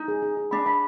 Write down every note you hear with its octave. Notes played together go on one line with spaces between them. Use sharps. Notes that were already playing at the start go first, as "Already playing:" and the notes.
Already playing: D#4
G#4
G#4
G#4
D4 B5
B5